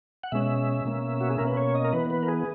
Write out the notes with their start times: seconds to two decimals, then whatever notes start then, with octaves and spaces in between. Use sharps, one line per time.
0.23 F#5
0.32 B2 G#3 C#4 E5
0.85 B2 A#3 C#4
1.21 F#4
1.30 G#4
1.38 B2 A#3 C#4 A#4
1.47 B4
1.57 C#5
1.75 D#5
1.84 A#4
1.93 E3 B3 B4
2.10 B4
2.23 A#4
2.28 G#4